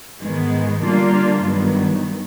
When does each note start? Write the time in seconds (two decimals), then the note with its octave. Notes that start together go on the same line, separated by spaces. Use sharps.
0.22 G#2 D#3 G#3 B3
0.83 D3 G3 A#3 D4 F4
1.43 G2 D#3 F#3 B3